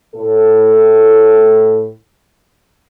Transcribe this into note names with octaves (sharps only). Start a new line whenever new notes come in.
A2 A4